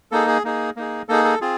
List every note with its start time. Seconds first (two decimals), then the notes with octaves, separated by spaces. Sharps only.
0.11 A#3 D#4 G#4 A4
0.28 G#4
0.44 A#3 D#4 G#4
0.76 A#3 D#4 G#4
1.09 A#3 D#4 G#4 A4
1.25 A4
1.41 C4 F4 G#4